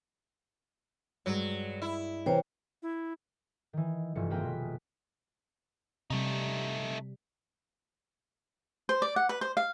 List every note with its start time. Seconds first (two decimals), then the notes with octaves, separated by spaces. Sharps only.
1.26 G2 F#3 G#3
1.82 E4
2.26 C3 E3 A#4 C5 C#5 G5
2.83 E4
3.73 D#3 E3
4.15 F1 G2 E3 F3 C#7
4.30 A#3 C4 G#4 A#4 B4 G5
4.43 B2 B6
6.10 C3 G3 A3 D#4
8.89 C5
9.02 D5
9.16 F#5
9.29 B4
9.41 C5
9.57 F5